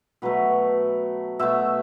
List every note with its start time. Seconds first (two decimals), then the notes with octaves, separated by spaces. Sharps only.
0.22 B2 F#3 A3 B4
1.39 B2 A3 E5